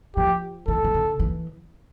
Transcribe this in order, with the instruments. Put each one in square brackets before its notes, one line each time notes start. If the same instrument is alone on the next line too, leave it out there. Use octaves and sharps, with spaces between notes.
[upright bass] F3 [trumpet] G4
[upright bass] E3 [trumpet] A4
[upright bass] E3
D3
E3